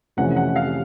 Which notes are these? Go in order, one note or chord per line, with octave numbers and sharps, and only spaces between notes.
F2 C3 E3 A3 C#4 F#5
F#5
F5